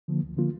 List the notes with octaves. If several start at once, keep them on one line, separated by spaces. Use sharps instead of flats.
D3 F3 A#3
D2
D3 F3 A#3 F4